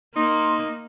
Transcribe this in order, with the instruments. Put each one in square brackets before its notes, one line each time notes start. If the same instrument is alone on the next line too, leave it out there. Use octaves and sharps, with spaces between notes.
[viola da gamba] A#3 [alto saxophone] D#4 [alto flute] C6